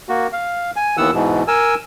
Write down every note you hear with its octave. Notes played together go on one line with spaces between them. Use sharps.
A#3 F#4
F5
G#5
D#2 D#3 E3 B3 F#5 E6
G#2 B2 E3
A#4 G#5 E6